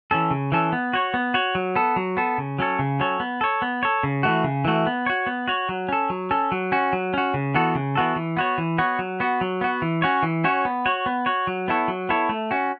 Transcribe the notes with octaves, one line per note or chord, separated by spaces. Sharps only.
E3 C#4 A4
C#3
E3 C#4 A4
B3
F#4 C#5
B3
F#4 C#5
F#3
B3 A4
F#3
B3 A4
C#3
F#3 C#4 A4 C#5
C#3
F#3 C#4 A4 C#5
B3
A4 C#5
B3
A4 C#5
C#3
E3 A3 F#4
C#3
E3 A3 F#4
B3
F#4 C#5
B3
F#4 C#5
F#3
C#4 A4
F#3
C#4 A4
F#3
C#4 F#4
F#3
C#4 F#4
C#3
E3 B3 F#4 A4
C#3
E3 B3 F#4 A4
E3
B3 F#4 C#5
E3
B3 F#4 C#5
F#3
B3 F#4
F#3
B3 F#4
E3
C#4 F#4 C#5
E3
C#4 F#4 C#5
B3
F#4 C#5
B3
F#4 C#5
F#3
B3 E4 A4 C#5
F#3
B3 E4 A4 C#5
A3
C#4 F#4